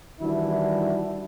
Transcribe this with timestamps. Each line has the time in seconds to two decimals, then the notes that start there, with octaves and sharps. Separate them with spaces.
0.21 D#3 E3 G3 D4 E4 F#4